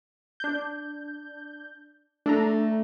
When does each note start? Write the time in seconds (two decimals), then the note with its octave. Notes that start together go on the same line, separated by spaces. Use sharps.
0.40 D4 G6
2.26 A3 D4 A4 A#5